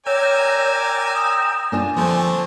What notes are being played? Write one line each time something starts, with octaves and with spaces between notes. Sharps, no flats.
A#4 C#5 D5 G5 G#5 A#5 E6
D#6
A#3 D4 F4 G#5
D3 F3 A3 C4